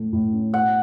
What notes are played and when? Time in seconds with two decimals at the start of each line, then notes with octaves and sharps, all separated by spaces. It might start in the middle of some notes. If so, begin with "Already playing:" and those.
Already playing: A2 A3
0.13 A2
0.33 C#4
0.53 B2 F#5